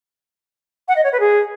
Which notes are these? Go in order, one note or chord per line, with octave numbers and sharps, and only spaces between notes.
F#5
D#5
C#5
B4
G#4